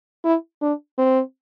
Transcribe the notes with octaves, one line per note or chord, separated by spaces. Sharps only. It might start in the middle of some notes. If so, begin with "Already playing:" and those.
E4
D4
C4